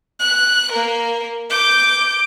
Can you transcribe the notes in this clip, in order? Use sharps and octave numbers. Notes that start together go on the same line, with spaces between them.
F#6
A#3 A#4
D6 G6